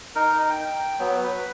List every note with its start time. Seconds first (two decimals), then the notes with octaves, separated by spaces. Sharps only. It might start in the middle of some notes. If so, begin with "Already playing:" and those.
0.15 D#4 A#4
0.50 G5
0.99 F#3 B3
1.24 B4